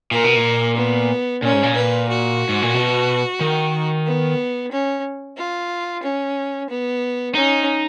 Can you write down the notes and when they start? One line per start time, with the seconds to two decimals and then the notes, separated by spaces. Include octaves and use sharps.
0.11 A#2 A#4
0.24 B2
0.36 A#2
0.77 B3
1.42 A#2 C#4
1.52 G#2
1.63 A#2
1.76 B4
2.09 F#4
2.49 G#2
2.62 A#2
2.75 B2
3.40 D#3
4.06 B3
4.72 C#4
5.37 F4
6.03 C#4
6.69 B3
7.35 C#4 D#4